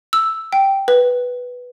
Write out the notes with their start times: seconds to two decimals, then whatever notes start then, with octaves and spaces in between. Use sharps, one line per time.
0.13 E6
0.53 G5
0.88 B4